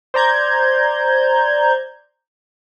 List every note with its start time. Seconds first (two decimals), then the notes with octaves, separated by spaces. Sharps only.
0.14 C5 D5 A#5 G6 G#6